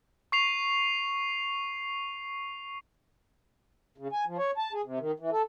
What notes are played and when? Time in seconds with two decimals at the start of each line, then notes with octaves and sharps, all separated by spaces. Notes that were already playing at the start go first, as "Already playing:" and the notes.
0.32 C#6 C7 F7
3.98 C#3
4.13 G#5
4.26 F3
4.38 C#5
4.58 A5
4.73 G#4
4.84 C3
4.99 D#3
5.20 E3
5.32 A4